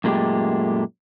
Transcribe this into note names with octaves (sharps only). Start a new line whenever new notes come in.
F#2 A#2 G#3 A3 G4